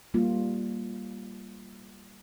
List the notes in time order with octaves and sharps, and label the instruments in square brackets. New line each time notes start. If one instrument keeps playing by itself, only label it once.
[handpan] G3 A#3 F4